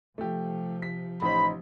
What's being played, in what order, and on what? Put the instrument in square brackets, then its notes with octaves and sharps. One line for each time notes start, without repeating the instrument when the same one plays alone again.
[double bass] C3 F3 [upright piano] A3 G4
[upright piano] B6
[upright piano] A1 D#4 C5 [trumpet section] B5